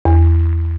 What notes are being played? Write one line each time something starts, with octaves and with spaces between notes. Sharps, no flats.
E2